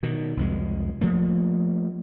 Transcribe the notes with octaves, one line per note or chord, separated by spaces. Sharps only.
B2 D#3
C2 F2 G#3
F3 A3 A#3